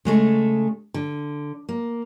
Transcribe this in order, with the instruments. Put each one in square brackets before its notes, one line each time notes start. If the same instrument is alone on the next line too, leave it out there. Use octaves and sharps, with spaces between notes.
[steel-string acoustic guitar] C#3 G#3 A3 A4
D3
A#3